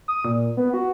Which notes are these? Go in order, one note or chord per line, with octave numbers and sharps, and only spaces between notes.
D#6
A#2
B3
F#4